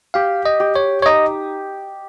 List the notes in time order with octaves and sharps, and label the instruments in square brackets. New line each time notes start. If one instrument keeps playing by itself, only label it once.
[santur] G4 [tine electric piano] F5
[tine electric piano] D#5
[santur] G4
[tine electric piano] C#5
C#5
[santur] D#4 [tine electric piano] D#5